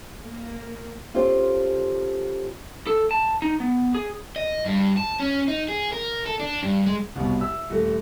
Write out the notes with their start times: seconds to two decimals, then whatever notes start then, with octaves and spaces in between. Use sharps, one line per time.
0.24 A#3
1.14 C#4 F4 G4 A4 C5 D5
2.87 A4
3.11 A5
3.42 D#4
3.60 B3
3.94 G#4
4.36 D#5
4.66 G2
4.97 A5
5.20 C#4
5.48 D#4
5.68 G#4
5.93 A#4
6.26 A4
6.39 D4
6.63 G2
6.86 G#3
7.16 C2 B2
7.40 E5 E6
7.70 D#1 A3